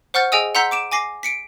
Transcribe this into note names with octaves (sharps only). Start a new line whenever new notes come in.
C5 F#5 C#6 F6 G6 A6
G#4 D#5 G5 G#5 D#6 E6
F#5 A#5 C6 E6 G6 B6
D6 D7 E7
G#5 D6 A#6 C7
B6 C#7 D7